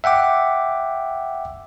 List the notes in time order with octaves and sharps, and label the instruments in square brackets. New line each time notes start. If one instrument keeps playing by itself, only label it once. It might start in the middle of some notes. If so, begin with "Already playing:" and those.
[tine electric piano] E5 F#5 G5 D6